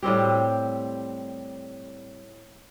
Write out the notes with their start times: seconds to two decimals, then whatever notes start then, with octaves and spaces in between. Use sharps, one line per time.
0.03 A2 G3 C4 G4